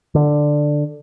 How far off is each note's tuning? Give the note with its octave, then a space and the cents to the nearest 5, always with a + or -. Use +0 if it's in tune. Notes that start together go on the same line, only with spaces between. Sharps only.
D3 +10